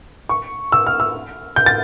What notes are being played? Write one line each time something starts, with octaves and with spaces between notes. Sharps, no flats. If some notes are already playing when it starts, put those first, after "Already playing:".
C#6
E6
F6
E6
G6
A6